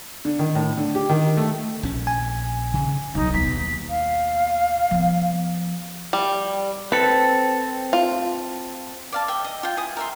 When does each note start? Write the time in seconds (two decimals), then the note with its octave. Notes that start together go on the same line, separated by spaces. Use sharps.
0.25 D3
0.39 D#3
0.55 A2
0.77 D3
0.95 G4
1.10 D#3
1.37 A3
1.83 A#1 C#4
2.07 G#5
2.74 C#3
3.15 B1 F#3 D#4
3.34 D#2 B2 B6
3.89 F5
4.91 F3 B3
6.13 G3
6.92 C4 A4 B4
7.93 F4
9.12 D5 F5 A5
9.28 E5 G5
9.44 D#5
9.63 F4 G5
9.77 E4 G#5 D#6
9.97 A#4 E5 C6